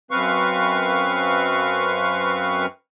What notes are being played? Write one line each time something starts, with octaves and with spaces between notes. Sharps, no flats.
F#2 C4 B4 F5 C#6